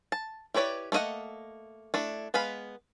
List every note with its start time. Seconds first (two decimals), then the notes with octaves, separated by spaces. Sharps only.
0.12 A5
0.54 E4 G4 B4 C#5 D5
0.92 A3 A#3 E4 D#5 F#5
1.94 A3 D4 E4
2.34 G#3 B3 B4 F5 B5